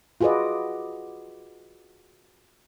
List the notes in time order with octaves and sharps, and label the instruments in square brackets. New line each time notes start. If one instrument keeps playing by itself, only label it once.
[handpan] F4 F#4 G#4 B4 D5 D#5